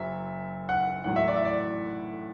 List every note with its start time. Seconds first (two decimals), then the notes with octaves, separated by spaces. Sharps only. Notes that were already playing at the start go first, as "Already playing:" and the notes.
Already playing: F#1 F#2 F#3 E5
0.69 F#5
1.04 A1 A2 F#3 F#5
1.16 E5
1.28 D5
1.36 E5
1.45 D5